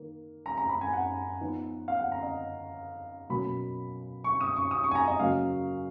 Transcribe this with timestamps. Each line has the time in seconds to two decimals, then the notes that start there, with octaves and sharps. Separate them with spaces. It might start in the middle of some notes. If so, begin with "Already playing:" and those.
Already playing: D#3 A#3
0.46 A#5
0.58 A#5
0.69 B5
0.81 G#5
0.93 F#5
1.41 F3 B3 D#4
1.88 F5
1.99 F#5
2.12 A#5
2.23 D#5
3.30 B2 F#3 A#3 C#4 B5
4.24 C#6
4.41 D#6
4.56 C#6
4.71 D#6
4.84 C#6
4.91 G#5
4.95 A#5
5.08 D#5
5.19 C#3 F#3 A#3 F5